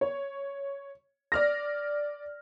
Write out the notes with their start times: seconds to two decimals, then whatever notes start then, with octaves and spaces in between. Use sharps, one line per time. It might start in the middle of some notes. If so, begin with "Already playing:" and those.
0.01 C#5
1.32 D5 F6 A#6